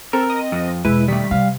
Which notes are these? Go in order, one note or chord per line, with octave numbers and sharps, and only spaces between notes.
C4 A4 A#4
D#5
F2
E1 G#3 E4 B4
D#3 G3 A3 B6
C3 F5